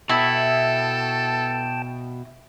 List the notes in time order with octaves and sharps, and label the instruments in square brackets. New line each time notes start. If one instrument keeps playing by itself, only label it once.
[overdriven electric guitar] B2 [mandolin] E4 [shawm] A4 [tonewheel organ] G5 A5